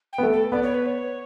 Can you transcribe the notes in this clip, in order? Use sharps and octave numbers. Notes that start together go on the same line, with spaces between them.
G5
B3
A3
A4
B3 D5
C#5
B4
C#5